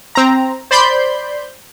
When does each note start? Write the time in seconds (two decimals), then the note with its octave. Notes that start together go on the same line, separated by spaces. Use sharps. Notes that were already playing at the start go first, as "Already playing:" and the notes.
0.15 C4 A#5
0.71 C5 D5 B5 C6 G6